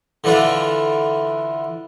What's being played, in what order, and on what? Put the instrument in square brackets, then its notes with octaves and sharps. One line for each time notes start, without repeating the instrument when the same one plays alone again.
[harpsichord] D3 E3 D4 E4 F4